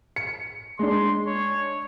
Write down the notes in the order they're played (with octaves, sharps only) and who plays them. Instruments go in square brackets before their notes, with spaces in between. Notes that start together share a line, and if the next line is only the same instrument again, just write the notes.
[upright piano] C#7
[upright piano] G#3 D4 [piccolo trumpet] C6
[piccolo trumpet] C#5